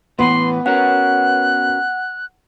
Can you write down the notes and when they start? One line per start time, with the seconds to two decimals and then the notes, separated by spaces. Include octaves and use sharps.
0.19 A2 E3 B3 B4 C6
0.66 C#4 F#4 A#4 F#5 F#6